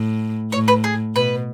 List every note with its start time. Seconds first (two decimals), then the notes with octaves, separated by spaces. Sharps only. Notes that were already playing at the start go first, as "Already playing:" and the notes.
Already playing: A2
0.52 A2 C#5
0.68 B4
0.84 G#4
1.16 B2 B4